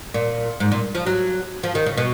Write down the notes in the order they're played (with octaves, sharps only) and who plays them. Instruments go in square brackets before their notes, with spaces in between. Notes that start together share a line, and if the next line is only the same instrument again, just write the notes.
[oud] A#2
G#2
A#2
F3
F#3
F3
D#3
C#3
B2